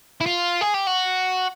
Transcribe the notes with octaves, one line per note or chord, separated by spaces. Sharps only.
E4
F4
G#4
G4
F#4